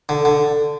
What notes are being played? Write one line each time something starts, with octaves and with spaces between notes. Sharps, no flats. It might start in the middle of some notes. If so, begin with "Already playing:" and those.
D3
D3